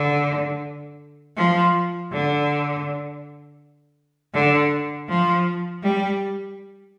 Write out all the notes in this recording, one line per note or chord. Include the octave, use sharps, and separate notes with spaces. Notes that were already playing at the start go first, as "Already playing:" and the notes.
Already playing: D3
F3
D3
D3
F3
G3